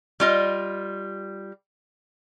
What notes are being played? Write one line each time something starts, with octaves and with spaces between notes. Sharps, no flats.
G3 F4 D#5